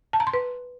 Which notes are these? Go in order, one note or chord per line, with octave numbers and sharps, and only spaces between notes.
A5
A#5
C6
B4